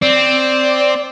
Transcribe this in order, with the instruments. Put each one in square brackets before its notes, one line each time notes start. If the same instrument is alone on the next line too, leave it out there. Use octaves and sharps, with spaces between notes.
[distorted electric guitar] C4 [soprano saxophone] D5